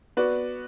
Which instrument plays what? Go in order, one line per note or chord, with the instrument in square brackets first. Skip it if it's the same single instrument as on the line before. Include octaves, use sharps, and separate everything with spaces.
[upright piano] B3 F#4 B4 D5